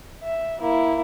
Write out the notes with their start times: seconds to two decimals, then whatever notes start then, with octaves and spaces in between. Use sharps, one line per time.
0.23 E5
0.59 A#3 E4